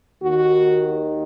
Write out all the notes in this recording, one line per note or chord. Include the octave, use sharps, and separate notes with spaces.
D#2 D#3 F#4